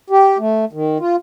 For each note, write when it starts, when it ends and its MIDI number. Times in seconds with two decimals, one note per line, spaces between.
0.10 0.38 67
0.39 0.65 57
0.73 0.98 51
1.00 1.16 65